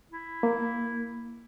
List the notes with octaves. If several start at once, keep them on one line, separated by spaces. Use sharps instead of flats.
E4
A#3